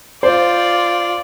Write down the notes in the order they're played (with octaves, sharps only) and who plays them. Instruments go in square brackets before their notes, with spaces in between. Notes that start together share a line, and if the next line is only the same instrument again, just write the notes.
[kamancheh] F4 D5 [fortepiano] C5